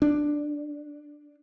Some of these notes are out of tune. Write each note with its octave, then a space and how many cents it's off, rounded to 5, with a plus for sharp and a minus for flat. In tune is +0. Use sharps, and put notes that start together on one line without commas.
D4 +5